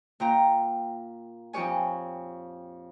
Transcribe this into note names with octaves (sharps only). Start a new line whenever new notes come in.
A#2 G5 A#5
F2 D#4 G4 C#5 G#5